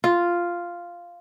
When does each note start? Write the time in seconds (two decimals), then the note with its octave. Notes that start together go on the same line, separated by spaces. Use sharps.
0.04 F4